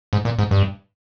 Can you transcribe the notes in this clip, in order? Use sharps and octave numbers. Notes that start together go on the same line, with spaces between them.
G#2
A#2
G#2
G2